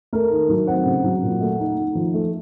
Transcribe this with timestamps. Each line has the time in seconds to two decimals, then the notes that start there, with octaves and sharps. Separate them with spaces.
0.13 A3 A#4
0.31 D#3
0.49 F#3
0.67 C4 F#5
0.86 C#3
1.04 F#3
1.22 A#2
1.41 A3
1.59 D#4
1.77 D#4
1.95 F3
2.14 A3